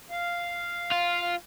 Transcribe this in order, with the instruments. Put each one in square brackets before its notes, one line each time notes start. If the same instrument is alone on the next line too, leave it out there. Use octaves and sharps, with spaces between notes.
[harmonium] F5
[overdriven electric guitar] F4